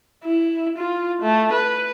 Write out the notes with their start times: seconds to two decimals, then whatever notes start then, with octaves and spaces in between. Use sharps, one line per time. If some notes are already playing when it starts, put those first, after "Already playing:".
0.24 E4
0.77 F4
1.22 A3
1.53 B4